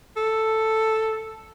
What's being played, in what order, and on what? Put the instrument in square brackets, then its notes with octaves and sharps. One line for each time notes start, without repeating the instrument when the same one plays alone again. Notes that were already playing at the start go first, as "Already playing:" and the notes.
[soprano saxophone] A4